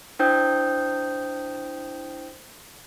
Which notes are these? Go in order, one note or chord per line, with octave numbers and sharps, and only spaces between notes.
D4 E4 C5 G5 D#6 G6